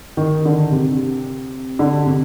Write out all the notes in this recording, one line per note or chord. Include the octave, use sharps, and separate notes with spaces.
D#3
D3
C3
D3
C3